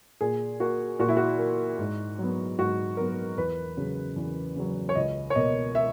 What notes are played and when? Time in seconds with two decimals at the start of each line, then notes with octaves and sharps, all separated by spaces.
0.21 A#2 G#4
0.60 A#3 F#4
0.99 A#2 F#4
1.08 E4
1.17 F#4
1.39 A#3
1.79 G#2
2.19 F#3 B3
2.59 G#2 F#4
2.97 F#3 B3 A#4
3.38 E2 B4
3.77 C#3 F#3
4.16 E2
4.56 C#3 F#3
4.89 C#5
4.95 C#2 D#5
5.30 C#5
5.35 B2 A#3 D#5
5.75 E5